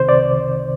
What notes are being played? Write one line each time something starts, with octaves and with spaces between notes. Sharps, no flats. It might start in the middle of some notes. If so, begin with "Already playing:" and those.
Already playing: C2 C3 D#3 C5
D5